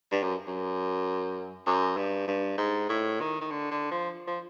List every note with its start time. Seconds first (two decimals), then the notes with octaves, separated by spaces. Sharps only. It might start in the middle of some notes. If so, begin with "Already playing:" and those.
0.11 G2
0.23 F#2
0.47 F#2
1.66 F#2
1.97 G2
2.28 G2
2.58 G#2
2.89 A2
3.20 D#3
3.41 D#3
3.51 D3
3.71 D3
3.91 F3
4.28 F3